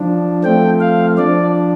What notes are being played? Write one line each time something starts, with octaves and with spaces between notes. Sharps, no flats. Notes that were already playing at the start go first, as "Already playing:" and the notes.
Already playing: F3 D4
F3 A3 C4 G5
F5
F3 D4 D5